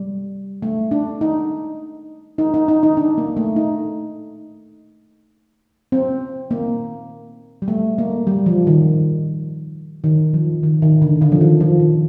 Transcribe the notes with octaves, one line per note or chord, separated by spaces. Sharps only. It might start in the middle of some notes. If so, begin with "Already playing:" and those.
Already playing: G3
A3
D4
D#4
D#4
D#4
D#4
D#4
D4
A#3
A3
D#4
C4
A#3
G3
A3
A#3
G3
F3
D#3
D#3
F3
D#3
D#3
D3
D3
F3
D#3
F3
D#3